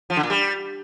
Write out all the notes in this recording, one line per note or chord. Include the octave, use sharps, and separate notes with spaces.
F3
D3
A#2
G3